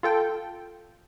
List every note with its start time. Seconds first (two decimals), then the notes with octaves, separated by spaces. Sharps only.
0.03 F4 A4 G5